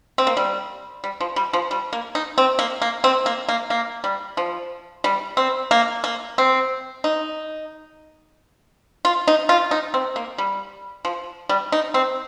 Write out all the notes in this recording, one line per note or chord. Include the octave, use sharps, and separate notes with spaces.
C4
A#3
G3
G3
F3
G3
F3
G3
A#3
D#4
C4
A#3
A#3
C4
A#3
A#3
A#3
G3
F3
G3
C4
A#3
A#3
C4
D#4
F4
D#4
F4
D#4
C4
A#3
G3
F3
G3
D#4
C4